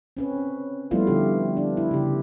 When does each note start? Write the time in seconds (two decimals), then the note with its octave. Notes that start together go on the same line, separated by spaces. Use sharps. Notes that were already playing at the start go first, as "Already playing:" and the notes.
0.17 C4 C#4 B4
0.91 F3 G3 A3 B3 E4 F4
1.07 D3 D4 G4
1.57 D4
1.77 E4
1.91 C#3 G4